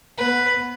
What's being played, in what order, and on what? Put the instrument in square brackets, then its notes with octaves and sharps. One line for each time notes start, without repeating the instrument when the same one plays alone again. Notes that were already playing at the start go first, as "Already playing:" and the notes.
[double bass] B3 [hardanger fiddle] B4